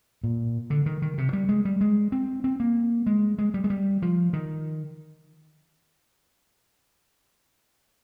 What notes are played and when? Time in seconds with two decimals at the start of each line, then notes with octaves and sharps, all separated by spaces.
0.23 A#2
0.70 D3
0.86 D#3
1.02 D#3
1.18 C3
1.33 G3
1.49 G#3
1.65 G3
1.81 G#3
2.12 C4
2.44 C4
2.60 A#3
3.06 G#3
3.38 G#3
3.54 G3
3.64 G#3
3.70 G3
4.02 F3
4.33 D#3